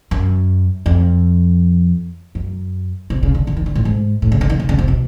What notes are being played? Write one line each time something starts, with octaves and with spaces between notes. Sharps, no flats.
F#2
F2
F#2
C3
C#3
D3
D3
D#3
D3
A2
G#2
A2
C#3
D3
D#3
D3
C#3
C3
B2